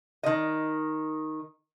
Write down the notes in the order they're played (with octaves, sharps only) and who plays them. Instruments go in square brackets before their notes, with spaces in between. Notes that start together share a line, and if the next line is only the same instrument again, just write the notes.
[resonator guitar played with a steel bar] D#3 D#5